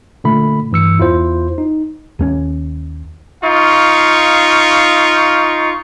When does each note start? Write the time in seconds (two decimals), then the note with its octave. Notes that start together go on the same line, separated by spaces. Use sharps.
0.24 A#2 D3 A3 B5
0.71 G2 E3 E6 C#7
0.98 E2 E4 F4 C5
1.58 D#4
2.19 D#2 A3 C#4
3.43 D#4 F4 F5 C#6